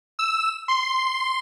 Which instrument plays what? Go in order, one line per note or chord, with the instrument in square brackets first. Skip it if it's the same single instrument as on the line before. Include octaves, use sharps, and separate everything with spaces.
[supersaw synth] E6
C6